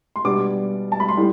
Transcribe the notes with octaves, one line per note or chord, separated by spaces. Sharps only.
C6
B2 G3 B3 D4 D6
A5
B5
C6
A2 G3